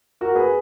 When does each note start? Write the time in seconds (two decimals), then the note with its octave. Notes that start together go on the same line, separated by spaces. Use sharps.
0.21 F#4 A#4
0.35 G#4 B4